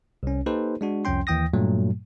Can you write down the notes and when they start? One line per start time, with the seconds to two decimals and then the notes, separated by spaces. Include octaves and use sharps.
0.23 C2 C#4
0.46 A#3 D#4 G4 A4 B4 C5
0.81 G#3 D4 F#4
1.05 C2 F2 F3 C#4 G5 C6
1.27 D#2 E3 G5 D#6 A#6
1.53 G2 A#2 F#3 A3